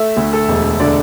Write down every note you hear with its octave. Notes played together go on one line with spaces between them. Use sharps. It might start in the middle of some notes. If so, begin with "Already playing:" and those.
Already playing: A3 E5
D2
A4
E1
D3 D5